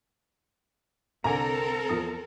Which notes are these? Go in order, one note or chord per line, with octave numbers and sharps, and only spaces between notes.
C2 D3 C4 A4 A#4 G#5 A#5
E2 F3 D#6